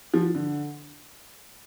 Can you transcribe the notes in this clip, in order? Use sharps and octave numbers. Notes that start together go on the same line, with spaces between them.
F3
D3